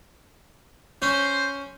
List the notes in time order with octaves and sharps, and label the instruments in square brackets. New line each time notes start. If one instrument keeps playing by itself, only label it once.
[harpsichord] C#4 [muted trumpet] C5